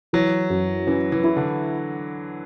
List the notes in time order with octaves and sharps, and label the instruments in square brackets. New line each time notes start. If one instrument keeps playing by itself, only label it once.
[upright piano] E3 [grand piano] F#3
[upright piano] F#2
[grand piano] E3 [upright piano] C#4
[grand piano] E3
[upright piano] E4
[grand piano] D3